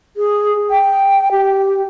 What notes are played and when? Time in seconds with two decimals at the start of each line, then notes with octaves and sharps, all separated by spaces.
0.17 G#4
0.71 G5
1.32 G4